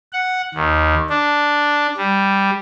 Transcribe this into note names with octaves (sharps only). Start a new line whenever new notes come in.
F#5
D#2
D4
G3